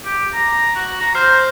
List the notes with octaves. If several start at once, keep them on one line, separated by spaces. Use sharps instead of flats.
G4
A#5
F#4
A#5
C5 F6 G6 C7